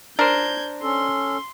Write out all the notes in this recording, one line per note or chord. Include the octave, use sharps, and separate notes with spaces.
D4 A#4 C5 G6 G#6
C#4 A4 C6